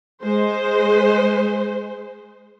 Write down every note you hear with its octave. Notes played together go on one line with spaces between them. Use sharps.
G#3 C5